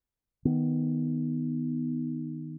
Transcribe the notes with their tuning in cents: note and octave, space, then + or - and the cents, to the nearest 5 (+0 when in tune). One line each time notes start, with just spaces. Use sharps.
D#3 +5 B3 +0